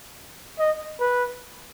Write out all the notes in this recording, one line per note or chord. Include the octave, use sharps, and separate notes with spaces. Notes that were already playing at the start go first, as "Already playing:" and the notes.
D#5
B4